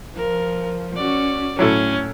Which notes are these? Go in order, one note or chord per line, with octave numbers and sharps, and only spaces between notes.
F3 A#4
C#4 F#4 D5
A2 F#3 C#4 E4 A4